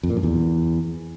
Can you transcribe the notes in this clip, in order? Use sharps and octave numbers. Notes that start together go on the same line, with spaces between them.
F2
A#2
F#2
E2